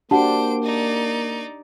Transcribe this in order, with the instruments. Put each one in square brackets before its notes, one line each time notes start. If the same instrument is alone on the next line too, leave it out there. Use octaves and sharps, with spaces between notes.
[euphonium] A#3 [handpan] D4 G4 [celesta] F#4 F#5 A5 [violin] C5 D7
[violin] D#4 D5